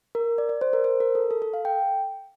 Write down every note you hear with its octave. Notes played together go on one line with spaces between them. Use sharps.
A#4
D5
D5
C5
A#4
C5
A#4
A4
A4
A4
F5
G5